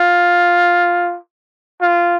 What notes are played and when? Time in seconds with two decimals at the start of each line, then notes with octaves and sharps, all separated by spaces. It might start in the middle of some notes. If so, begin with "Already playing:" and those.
Already playing: F4
1.81 F4